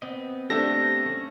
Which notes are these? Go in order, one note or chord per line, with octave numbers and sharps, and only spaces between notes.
B3 C4 D#5
A3 D4 G4 A4 C5 E5 A#6
A3 C#4